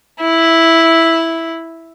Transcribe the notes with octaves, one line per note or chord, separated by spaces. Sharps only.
E4 E5